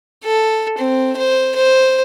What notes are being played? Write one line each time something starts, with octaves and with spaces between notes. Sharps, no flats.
A4
C4
C5
C5